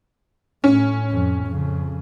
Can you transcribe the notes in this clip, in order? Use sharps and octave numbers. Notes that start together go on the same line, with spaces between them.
A2 C#4
F2
F2 C#3